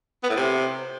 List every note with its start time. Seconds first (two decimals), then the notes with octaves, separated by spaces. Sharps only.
0.23 B3
0.30 A2
0.36 C3